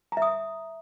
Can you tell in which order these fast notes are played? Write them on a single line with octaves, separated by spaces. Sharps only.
A#5 E5 D#6